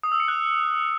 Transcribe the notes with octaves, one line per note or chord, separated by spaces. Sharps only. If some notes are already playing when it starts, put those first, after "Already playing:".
D#6
E6
C#7
F#6